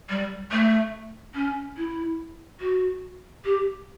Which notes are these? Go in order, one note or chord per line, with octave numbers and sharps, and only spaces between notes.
G3
A3
C#4
E4
F#4
G4